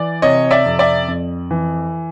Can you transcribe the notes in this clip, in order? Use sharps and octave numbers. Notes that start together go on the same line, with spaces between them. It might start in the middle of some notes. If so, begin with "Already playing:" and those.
Already playing: E3 D5
C3 C#5 D#5
D5 E5
F2
D5 E5
F2
E3